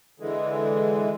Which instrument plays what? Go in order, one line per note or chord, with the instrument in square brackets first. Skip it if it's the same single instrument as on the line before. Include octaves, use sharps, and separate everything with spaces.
[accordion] D3 E3 G#3